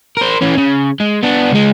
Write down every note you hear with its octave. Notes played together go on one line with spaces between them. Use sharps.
A#4 C5
E3 C#4
C#3
G#3
B3 D4
C#2 G#3